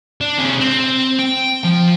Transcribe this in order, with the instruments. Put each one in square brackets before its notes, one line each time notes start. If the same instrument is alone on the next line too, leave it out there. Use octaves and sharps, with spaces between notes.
[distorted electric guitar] D4
C3 G#4
C4
G5
F3